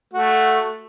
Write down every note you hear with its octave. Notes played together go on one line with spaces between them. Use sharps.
A3 F#4